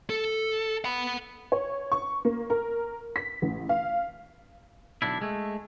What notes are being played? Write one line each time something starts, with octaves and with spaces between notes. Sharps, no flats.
A4
F#5 B5
C#5
C#6
A#3
A#4
B6
A1
F5
B1 D3 D4 E4
G#3 A3